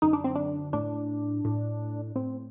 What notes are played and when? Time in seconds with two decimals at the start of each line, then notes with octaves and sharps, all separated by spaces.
0.02 F#2 D3 D#4
0.13 D4
0.24 C4
0.36 D4
0.73 A2 D4
1.45 A2
2.16 A2 C4